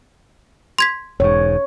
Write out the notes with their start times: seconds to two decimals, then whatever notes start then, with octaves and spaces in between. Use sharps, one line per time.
0.79 C6 G#6 B6
1.20 E1 G#2 C#5